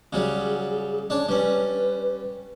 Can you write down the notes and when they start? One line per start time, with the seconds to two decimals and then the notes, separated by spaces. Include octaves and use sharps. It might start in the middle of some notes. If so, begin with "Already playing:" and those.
0.13 C#3 F#3 G3 G#4
1.10 C#4 D4 C#5
1.29 G3 C#4 B4